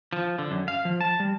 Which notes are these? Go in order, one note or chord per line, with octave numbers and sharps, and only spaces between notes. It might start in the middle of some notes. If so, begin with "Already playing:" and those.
F3
D3
F#2
F5
F3
A5
G3